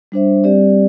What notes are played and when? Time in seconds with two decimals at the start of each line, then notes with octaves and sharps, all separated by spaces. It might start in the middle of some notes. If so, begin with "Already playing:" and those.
0.12 G3 D4 C5 E5
0.44 G3 C4 G4 D5